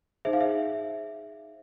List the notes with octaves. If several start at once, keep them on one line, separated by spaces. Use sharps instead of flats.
D#4 G#4 C5 E5
F5
E5